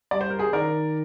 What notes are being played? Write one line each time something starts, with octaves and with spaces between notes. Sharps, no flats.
G3 D5
C5
A#4
G#4 C5
D#3 A#4 D5